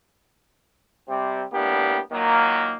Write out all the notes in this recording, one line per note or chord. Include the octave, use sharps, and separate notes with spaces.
C3 G3 C4
A2 G3 A#3 B3 D4 G4
A#2 D#3 F#3 A#3